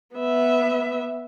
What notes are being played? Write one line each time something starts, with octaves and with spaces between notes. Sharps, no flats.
B3 E5